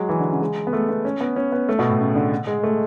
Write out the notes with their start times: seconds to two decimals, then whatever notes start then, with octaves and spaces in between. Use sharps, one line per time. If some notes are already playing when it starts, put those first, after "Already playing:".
Already playing: F#3 G#3
0.09 E3
0.20 D3
0.30 C#3
0.41 G#3
0.67 B3
0.73 A3
0.89 B3
1.05 C#4
1.21 B3
1.36 C#4
1.52 B3
1.69 A3
1.79 B2
1.89 A2
2.00 C#3
2.15 D3
2.47 G#3
2.63 A3